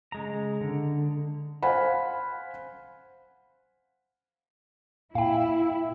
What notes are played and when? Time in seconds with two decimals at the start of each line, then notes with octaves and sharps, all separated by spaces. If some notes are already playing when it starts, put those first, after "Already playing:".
0.12 C#3 G#3 A#5
0.61 D3
1.63 C5 F5 F#5 G#5 B5
5.15 A#2 E4 F5 G5